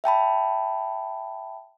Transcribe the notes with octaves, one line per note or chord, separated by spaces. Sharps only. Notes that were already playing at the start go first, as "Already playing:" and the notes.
E5 G5 A5 B5